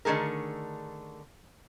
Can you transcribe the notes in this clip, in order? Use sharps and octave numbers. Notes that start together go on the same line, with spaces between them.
D3 D#3 A3 G#4 A#4